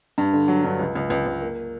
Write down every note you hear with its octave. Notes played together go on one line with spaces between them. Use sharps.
G2
D3
F#3
G2
C#2
C#2
C#2
C#2
A#3